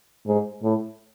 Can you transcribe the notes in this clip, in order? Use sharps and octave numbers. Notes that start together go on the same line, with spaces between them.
G#2
A2